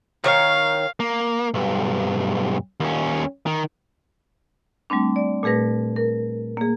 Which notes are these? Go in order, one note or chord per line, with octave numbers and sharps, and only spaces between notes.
D#3 C#5 F5
A#3
B1 G2
D#2 C#4
D#3
G3 A3 C4 D4
D5
A#2 A3 G#4 B4 A#6
A#4
A#3 G#4